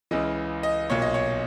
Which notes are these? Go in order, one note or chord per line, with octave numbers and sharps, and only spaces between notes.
C#2 C#3 E3 D#5
D#5
B1 A#2 C#5
D#5
C#5